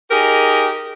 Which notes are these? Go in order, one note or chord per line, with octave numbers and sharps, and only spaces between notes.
D#4 G4 G#4 A#4